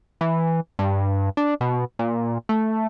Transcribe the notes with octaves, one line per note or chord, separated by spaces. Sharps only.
E3
G2
D4
B2
A#2
A3